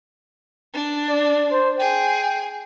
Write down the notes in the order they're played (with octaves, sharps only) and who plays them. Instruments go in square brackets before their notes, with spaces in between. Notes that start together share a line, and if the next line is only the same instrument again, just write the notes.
[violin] D4
[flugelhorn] D5
C5
[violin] G#4 [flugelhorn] G5